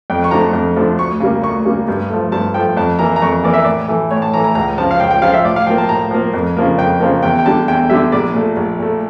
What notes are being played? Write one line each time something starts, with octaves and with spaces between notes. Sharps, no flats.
F2 G5
C#6
D3 F3 A3 A#5
F2
D3 F3 A3
D2 C#6
C#3 G3 A#3
D2 C#6
C#3 G3 A#3
G2
F3 A3
G2 A5
F3 A3 G5
F2 A5
E3 A#3 A#5
A#5
F2 C#6
E3 A#3 D5
E5
A2 D5
E3 A3
A2 C#5
A5
E3 A3 A#5
A#5
C#2 A#5
C#3 F3 A5
F5
C#2 G5
G5
C#3 F3 F5
E5
A2 D5
F5
F3 A#3 G5
A5
A2 A#5
F3 A#3
F2
C#3 F3 A#3
F2 G5
C#3 F3 A#3
E2 G5
G5
D3 G3 A5
E2 G5
D3 G3 E5
A#1 D5
A#2 A3
A#1
A#2 A3